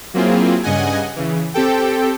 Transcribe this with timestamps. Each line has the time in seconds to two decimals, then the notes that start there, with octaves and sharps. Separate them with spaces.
0.14 F#3 A#3 C4 E4 F4 G#4
0.63 G2 C#3 D#5 F#5 G#5
1.16 C#3 E3
1.54 C4 G4 A4 G5